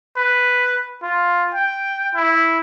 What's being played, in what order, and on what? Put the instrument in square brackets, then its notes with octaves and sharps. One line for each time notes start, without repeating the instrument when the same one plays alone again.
[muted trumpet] B4
F4
G5
E4